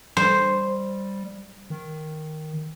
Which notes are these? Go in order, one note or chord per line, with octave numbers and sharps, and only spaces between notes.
G3 C5
D#3